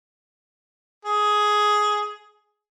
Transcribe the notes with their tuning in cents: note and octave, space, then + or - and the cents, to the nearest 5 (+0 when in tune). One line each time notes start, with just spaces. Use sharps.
G#4 +10